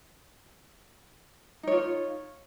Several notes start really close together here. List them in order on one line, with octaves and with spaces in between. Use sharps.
D#4 C#5 F4